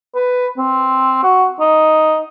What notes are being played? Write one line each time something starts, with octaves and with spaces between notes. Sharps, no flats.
B4
C4
F#4
D#4